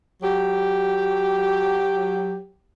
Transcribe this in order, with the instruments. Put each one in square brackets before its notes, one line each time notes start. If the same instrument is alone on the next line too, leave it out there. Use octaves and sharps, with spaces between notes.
[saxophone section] F#3 G4